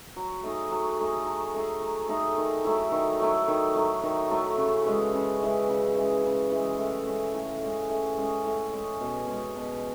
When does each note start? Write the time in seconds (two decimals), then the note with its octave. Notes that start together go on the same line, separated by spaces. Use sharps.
0.16 F#3
0.43 A3 D#4 G#4
0.71 F#3
0.99 A3 D#4 G#4
1.26 F#3
1.54 A3 D#4 G#4
1.82 F#3
2.09 A3 D#4 G#4
2.38 D#3
2.65 F#3 A3 E4
2.92 D#3
3.20 F#3 A3 E4
3.48 D#3
3.75 F#3 A3 E4
4.03 D#3
4.30 F#3 A3 E4
4.57 C#3
4.86 E3 G#3
5.14 C#3
5.41 E3 G#3
5.69 C#3
5.97 E3 G#3
6.24 C#3
6.51 E3 G#3
6.79 A2
7.06 G#3 C#4
7.35 A2
7.63 G#3 C#4
7.89 A2
8.17 G#3 C#4
8.45 A2
8.73 G#3 C#4
9.01 B2
9.27 G#3 C#4
9.56 B2